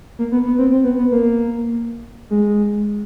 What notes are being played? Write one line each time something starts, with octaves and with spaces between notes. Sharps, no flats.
A#3
B3
B3
C4
C4
B3
B3
A#3
G#3